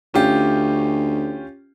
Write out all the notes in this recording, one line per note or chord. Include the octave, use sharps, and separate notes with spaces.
D2 C#4 F4 G4